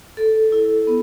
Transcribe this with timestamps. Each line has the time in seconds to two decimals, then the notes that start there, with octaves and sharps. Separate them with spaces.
0.17 A4
0.52 E4
0.87 B3